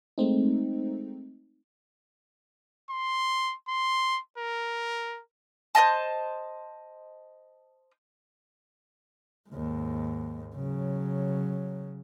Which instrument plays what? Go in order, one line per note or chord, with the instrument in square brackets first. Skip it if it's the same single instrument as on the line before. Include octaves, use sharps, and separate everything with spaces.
[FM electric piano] G#3 A3 C4 D#4
[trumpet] C6
C6
A#4
[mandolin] C5 D5 D#5 A5
[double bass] D#2 G#2
C#3 F#3